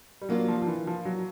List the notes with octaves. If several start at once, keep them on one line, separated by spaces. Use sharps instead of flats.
G3
F#3 A#3 D4 F4
F3
F3
E3
F3
F#3